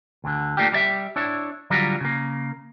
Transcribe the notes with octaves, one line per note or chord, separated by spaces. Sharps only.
D2 D3
A3 A#3 D4 F4 G4
G3 G4 D5 E5
D4 E4 C#5
D3 F#3 G3 F4 A#4
C#3 A#3